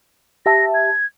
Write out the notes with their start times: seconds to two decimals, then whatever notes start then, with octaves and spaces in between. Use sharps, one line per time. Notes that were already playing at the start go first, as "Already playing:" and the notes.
0.46 G4 E5 A5 A#6
0.74 G#6